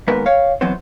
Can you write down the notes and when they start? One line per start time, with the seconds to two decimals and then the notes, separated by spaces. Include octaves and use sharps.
0.08 D#2 G#2 B3 A#4 B4
0.26 C#5 F5
0.61 E3 F#3 B3 C4 C5